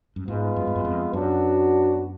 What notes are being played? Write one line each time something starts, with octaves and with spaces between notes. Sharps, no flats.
F#2
G#2 G#3 B3 F4 B4
F#2
G#2
F#2
F2
F#2 F#3 B3 D4 F#4